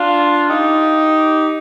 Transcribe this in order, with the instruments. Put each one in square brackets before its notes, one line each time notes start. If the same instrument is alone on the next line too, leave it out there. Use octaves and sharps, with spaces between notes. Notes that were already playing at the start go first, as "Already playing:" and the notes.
Already playing: [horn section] D4 F4
D#4 G4